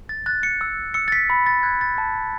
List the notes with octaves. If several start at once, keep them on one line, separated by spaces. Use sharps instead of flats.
A6
F#6 A6
C#7
E6
E6 C#7
A6
B6
B5
A6
F#6 G#6
A6
A5